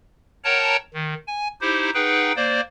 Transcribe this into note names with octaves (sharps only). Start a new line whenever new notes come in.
A#4 C#5 F#5 G5 A5 A#5
D#3
G#5
D#4 E4 G4 C5
D#4 G#4 B4 F#5 G5
A#3 C5 D5